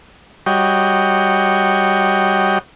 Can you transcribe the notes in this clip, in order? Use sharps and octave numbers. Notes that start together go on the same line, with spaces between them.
G3 F#4 C#5 D#5 G5